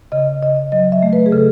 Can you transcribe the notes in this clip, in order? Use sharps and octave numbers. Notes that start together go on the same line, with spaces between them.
C#3 D#5
C#3 D#5
F#3 D#5
E5
A3
B4
G#4
C#3 A4